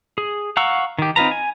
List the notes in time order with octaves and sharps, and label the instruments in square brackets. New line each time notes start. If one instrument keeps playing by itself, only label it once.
[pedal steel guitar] G#4
F5 F#5 A#5 C#6 E6
D#3 G4
C4 D#4 F4 B4 A#5
G#5